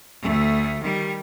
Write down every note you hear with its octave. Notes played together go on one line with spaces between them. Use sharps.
D2 A3
D#3 G3